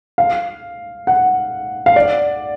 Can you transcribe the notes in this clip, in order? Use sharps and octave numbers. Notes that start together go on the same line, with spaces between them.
F5
F#5
F5
D5